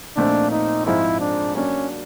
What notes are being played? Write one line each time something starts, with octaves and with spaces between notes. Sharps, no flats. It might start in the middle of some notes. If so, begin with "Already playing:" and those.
A#2 F3 A3 C4 D4 D#4
D#4
G#2 F3 G#3 C4 D#4 E4
D4
F#3 A#3 C#4 D4